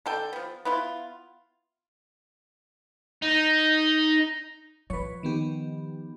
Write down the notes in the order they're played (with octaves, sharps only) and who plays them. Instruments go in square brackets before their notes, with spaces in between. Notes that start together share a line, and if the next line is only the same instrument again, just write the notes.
[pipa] D3 A4 G5
F3 B3
B3 E4 F4
[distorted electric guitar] D#4
[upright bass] F3 [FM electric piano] B4 C#5
[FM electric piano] D#3 B3 G4